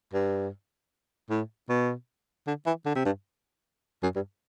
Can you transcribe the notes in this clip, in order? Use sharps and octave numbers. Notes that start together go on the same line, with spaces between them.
G2
A2
B2
D3
E3
D3
C3
G2
F#2
G2